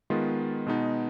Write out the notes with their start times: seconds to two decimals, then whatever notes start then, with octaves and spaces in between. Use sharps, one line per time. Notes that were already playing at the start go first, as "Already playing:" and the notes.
0.10 D#3 G#3 B3 F4
0.66 B2 G#3 B3 D#4